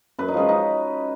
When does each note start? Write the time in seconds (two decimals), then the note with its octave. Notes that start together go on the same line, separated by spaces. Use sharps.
0.18 F#2 B4
0.28 D#4
0.34 F3 G#3 C#4
0.49 D#4